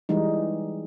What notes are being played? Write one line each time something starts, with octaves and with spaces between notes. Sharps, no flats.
E3 G3 G#3 D#4